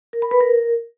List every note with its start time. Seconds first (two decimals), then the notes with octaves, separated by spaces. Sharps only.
0.13 A#4
0.22 B5
0.31 B4
0.40 A#4